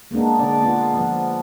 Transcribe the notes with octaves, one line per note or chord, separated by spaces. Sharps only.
G#3 A#3 B3 D4
D3 D4 D5
B3 F4
F3 B3